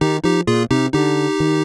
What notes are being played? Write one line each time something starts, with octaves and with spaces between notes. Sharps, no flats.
D#3 D#4 G4
F3 D#4 G4
A#2 F4 G#4
C3 D#4 G4
D3 D#4 G4
D#3